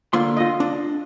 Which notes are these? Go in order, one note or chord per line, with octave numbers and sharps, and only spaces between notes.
D3 A#3 F4 C6
F4 D#5
D4